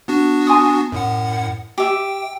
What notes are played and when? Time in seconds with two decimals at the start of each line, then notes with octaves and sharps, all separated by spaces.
0.08 B3 D4 F#4
0.47 G#5 C6 D#6
0.92 F#2 A2 F#5
1.78 G4 E5 G5